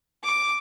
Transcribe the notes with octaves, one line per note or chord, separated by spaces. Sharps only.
D6